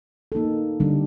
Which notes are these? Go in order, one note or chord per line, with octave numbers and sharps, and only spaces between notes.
A#3 D#4 A4
D3 G3 D4